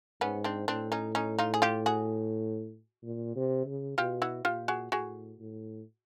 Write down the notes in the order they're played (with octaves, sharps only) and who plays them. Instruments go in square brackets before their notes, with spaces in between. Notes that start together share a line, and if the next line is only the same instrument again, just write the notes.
[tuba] G#2 [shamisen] B3 C#4
[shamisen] C4 D4
[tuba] A2 [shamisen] C4 D4
[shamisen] C#4 D#4
C#4 D#4
D#4 F4
G#4
F4 G4
F#4 G#4
[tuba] A#2
C3
C#3
[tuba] B2 [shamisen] F4 G4
[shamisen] E4 F#4
[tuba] A#2 [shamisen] F4 G4
[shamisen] F#4 G#4
[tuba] A2 [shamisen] F#4 G#4
[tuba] A2